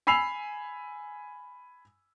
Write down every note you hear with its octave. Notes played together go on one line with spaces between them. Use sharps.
G#5 B5 E6 C7 F7